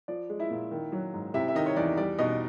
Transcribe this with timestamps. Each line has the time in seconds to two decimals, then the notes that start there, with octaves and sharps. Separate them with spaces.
0.08 F3 D5
0.30 G#3
0.40 E4 E5
0.50 A#2
0.71 D#3
0.92 F#3
1.14 G#2
1.34 C3 E4 E5
1.48 E5
1.55 D#3 D#4 D#5
1.66 C#5
1.77 E2 D5
1.97 G3 D5
2.19 B2 D#4 D#5